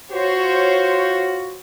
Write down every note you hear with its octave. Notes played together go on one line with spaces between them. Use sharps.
F4 F#4 C5 C#5